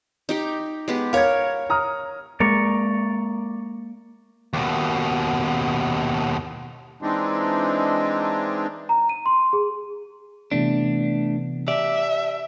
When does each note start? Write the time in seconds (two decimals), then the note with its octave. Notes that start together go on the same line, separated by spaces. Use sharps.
0.29 D#4 G4 G5
0.88 G#3 B3 G4
1.13 A#4 C#5 F5 G#6
1.70 A#5 D#6 F6
2.40 G#3 A#3 D5 A#5 C#6
4.53 D#2 B2
7.02 E3 G#3 C4 D4 D#4
8.89 A#5
9.09 D#7
9.26 C6
9.53 G#4
10.51 C3 E3 A3 B3 D4
11.68 G4 D5 E5